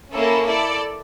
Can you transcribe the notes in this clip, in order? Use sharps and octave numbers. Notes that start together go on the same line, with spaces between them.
A#3 C#4 E4 A4
E4 A4 D5